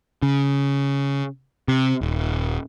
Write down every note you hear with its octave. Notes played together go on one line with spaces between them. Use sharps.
C#3
C3
D#1